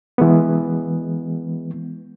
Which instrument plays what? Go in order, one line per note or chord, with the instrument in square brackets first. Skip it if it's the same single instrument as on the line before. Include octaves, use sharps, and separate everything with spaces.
[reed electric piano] E3 G#3 B3